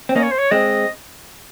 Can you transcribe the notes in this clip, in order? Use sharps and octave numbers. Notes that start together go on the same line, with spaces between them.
C4
A#3 C#4 D#5
C#5
C5
C#5
G#3 C4 D#5